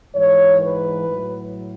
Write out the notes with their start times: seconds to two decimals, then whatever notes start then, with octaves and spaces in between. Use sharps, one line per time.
0.15 G#2 E3 C#5
0.61 B4
1.07 A2 F#3